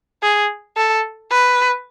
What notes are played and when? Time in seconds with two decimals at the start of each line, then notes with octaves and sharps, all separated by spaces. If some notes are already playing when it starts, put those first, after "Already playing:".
0.23 G#4
0.77 A4
1.32 B4